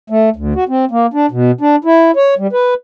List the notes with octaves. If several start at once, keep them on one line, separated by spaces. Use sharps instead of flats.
A3
D2
F#4
C4
A#3
D4
B2
D4
E4
C#5
G3
B4